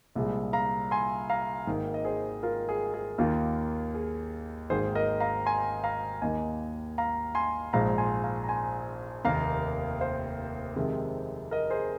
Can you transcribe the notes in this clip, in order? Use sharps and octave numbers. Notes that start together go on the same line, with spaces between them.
C2 A#2 F3 G#3 G#4
F5 A#5
G#5 C6
F5 A#5
G#1 G#2 D#3 A#3
D#5
G#4 C5
F4 A#4
G#4
G#4
D#2 D#3 A#3 F4
G#4
G#1 G#2 D#3 A#3 G#4 C5
A#4 D#5
F5 A#5
G#5 C6
F5 A#5
D#2 D#3 A#3 D#5 G#5
F5 A#5
G#5 C6
A#1 G#2 F3 G#3 F5 A#5
G#5 C6
F5 A#5
A#5
G#5 C6
F1 D#2 D#3 A#3 F5 A#5
C5 F5
F2 C3 D#3 G#3
A#4 D#5
G#4 C5